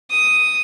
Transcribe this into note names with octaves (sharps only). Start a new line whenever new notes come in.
D#6